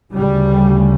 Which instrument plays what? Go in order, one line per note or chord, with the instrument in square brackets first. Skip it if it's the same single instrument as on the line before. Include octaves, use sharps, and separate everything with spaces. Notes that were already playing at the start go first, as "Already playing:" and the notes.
[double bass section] D2 C#3 G3